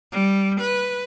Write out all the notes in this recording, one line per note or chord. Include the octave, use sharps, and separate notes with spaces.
G3
B4